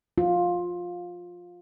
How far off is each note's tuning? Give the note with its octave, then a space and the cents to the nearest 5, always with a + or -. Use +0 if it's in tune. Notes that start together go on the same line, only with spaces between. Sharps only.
F4 +15